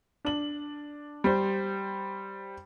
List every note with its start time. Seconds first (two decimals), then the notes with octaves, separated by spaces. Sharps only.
0.25 D4 F#7
1.24 G3 C5